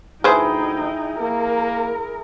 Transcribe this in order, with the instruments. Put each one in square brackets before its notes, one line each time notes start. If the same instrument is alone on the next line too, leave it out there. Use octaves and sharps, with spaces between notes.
[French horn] D2 [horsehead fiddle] D#4 G5 [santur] E4 G#4 [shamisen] B4 C5
[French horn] A#3 [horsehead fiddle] A#4